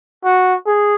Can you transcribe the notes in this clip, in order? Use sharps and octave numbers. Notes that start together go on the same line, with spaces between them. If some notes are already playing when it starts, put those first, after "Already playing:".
F#4
G#4